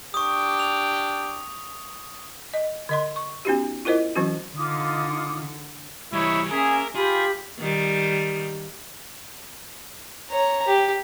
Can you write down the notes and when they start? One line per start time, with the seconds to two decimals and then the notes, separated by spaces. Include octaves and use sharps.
0.14 D4 G4 C#6 D#6
0.60 F7
2.53 D#5
2.89 D3 D#5 C6
3.16 C#6
3.45 B3 C#4 D#4 F#4 G4
3.85 E4 F4 A#4 C5 D#5
4.15 E3 F#3 C4 C#4 F#4
4.56 D3 D#4 F4 D6 D#6
6.13 E3 G3 D#4 E4 C#5
6.51 A#3 C#4 G#4 A#4 C#5 E5
6.95 F4 G4 G#4 G5 B5
7.60 D#3 G3
10.31 C#5 A#5
10.67 G4